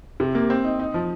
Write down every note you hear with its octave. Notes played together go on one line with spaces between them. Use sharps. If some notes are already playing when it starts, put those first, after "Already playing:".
C3
A#3
C4
D#4
D#4
F3